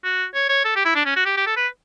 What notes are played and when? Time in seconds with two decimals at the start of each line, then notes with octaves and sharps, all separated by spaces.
0.04 F#4
0.34 C#5
0.49 C#5
0.65 A4
0.76 G4
0.85 E4
0.95 D4
1.05 C#4
1.16 F#4
1.26 G4
1.37 G4
1.47 A4
1.56 B4